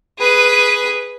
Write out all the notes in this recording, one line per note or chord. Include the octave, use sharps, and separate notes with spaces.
G#4 B4